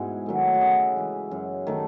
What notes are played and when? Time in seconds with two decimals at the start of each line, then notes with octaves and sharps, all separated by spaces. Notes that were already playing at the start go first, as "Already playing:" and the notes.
Already playing: G#2 B2 G#3 E4 G#4
0.26 D#3 F#3 A3
0.54 F#4
0.61 C#3 E4 G#4
0.96 E3 G#3
1.31 F#2
1.67 D#3 A3